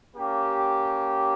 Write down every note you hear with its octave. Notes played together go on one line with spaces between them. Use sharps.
A#3 C#4 G4